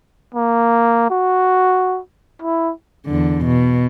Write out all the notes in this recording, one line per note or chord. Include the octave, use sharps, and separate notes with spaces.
A#3
F#4
E4
E2 D3
B2